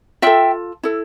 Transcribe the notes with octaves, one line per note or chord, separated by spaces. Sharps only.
F4 A4 E5 G5
E4 A4